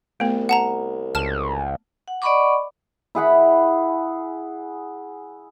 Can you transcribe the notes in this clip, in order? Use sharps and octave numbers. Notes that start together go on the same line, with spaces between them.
C2 A3 B3
F#5 A5 A#5
C#2 A5 F6
F#5
D5 D#5 F#5 B5 C#6 D6
E4 G#4 F#5 B5